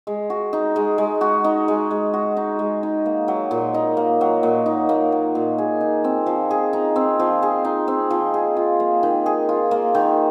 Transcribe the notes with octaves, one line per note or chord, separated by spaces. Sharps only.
G#3
F#4
D#4
G#3
G#3
F#4
D#4
G#3
G#3
F#4
D#4
G#3
D#4
A#3
F#3
A#2
D#4
A#3
F#3
A#2
D#4
A#3
F#3
A#2
G#4
D#4
C4
F3
G#4
D#4
C4
F3
G#4
D#4
C4
F3
G#4
F4
A#3
D#3
G#4
F4
A#3
D#3